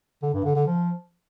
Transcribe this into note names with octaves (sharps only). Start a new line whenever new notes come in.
D3
G2
D3
D3
F3